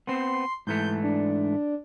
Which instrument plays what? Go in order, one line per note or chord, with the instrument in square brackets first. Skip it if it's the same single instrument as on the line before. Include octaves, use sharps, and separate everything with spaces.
[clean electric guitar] B3 C4 [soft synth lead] C6
[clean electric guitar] G#2 E3 A3 [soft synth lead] G6
[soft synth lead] D4